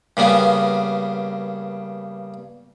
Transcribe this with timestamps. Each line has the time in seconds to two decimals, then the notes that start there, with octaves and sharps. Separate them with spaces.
0.17 G2 C#3 A#3 B3